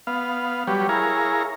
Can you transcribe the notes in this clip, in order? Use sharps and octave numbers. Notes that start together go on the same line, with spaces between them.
B3 F5
F#3 G3 G4 B4 C#5
E4 G#4 A#4 C#5 F5 A#5